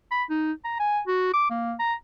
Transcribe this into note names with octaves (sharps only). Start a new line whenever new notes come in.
B5
D#4
A#5
G#5
F#4
D6
A#3
A#5